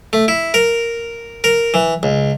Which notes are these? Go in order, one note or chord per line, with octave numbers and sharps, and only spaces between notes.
A3
E4
A#4
A#4
E3
C#2